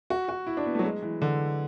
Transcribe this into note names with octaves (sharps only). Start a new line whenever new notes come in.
F#4
F#4
E4
D4
B3
A3
F#3
G#3
E3
D3